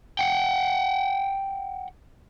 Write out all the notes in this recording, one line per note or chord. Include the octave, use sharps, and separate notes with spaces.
F#5 G5